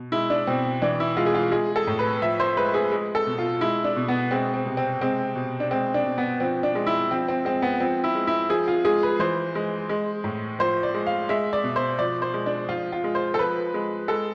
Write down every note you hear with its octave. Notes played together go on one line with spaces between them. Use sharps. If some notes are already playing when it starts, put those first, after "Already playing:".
Already playing: B2
G#3 E4
D4
B2 C4
E3 D4
E4
G#3 F4
G#4
F4
G#3 G#4
A4
A2
B4
F3 E5
C5
G#3 B4
G#4
G#3
A4
B2
F4
G#3 E4
D4
B2
B3
G#3 C4
C4
C3
C4
G#3 C4
B2
D4
G#3 C4
D4
B2
B3
F3 C4
D4
G#3
E4
F3 C4
C4
G#3 C4
B3
F3 C4
E4
G#3
E4
F3 G#4
F4
G#3 G#4
B4
E3 C5
G#3
G#3
A2
F3 C5
D5
G#3
F5
G#3 E5
D5
B2
C5
F3 D5
C5
G#3
D4
F3 F4
F4
G#3
C5
A4
F3 B4
G#3
G#3 A4